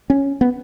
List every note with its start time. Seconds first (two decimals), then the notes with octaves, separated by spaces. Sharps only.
0.10 C#4
0.41 B3